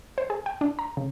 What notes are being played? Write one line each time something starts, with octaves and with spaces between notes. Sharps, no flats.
C5
G#4
G5
D4
A#5
C#3